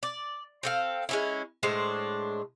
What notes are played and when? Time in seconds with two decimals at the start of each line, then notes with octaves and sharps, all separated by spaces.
0.03 D5
0.63 C4 A4 F5
1.09 G#3 C#4 E4
1.63 A2 G#3 D4 C5